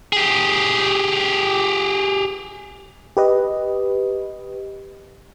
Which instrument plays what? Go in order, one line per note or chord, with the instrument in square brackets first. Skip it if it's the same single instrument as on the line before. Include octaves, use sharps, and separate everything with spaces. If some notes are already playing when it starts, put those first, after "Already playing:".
[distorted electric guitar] G4 G#4
[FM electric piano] G4 B4 D#5